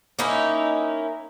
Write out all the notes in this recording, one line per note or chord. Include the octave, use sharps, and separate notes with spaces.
A#3 C#4 D#4 E4